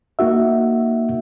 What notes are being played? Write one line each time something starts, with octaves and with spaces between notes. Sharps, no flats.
A#3 D#4 F#4 E5